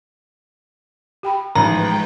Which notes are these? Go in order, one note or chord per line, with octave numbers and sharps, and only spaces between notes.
G4 G5 B5
A1 F3 G#3 D#4 B4 G5 A#5